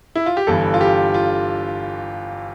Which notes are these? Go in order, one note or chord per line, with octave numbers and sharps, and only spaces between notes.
E4
F4
G4
G1 G2 E3 A4
F4
G4
F4